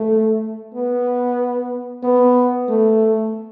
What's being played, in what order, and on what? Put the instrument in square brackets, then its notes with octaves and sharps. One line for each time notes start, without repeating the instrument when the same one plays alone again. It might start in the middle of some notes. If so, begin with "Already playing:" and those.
Already playing: [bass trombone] A3
B3
B3
A3